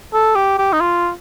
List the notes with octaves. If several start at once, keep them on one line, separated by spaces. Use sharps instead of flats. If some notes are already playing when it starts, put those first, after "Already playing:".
A4
G4
G4
D#4
F4